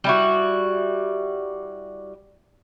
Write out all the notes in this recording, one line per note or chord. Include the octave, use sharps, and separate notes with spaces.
G3 E4 F#4